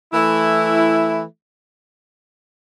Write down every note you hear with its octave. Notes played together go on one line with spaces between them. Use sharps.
E3 A3 E4